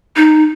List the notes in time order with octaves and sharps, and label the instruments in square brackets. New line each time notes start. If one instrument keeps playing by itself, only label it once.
[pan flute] D#4